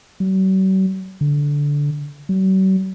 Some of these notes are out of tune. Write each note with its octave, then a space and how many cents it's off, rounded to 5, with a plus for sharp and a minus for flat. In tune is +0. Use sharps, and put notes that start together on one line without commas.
F#3 +45
D3 -15
F#3 +45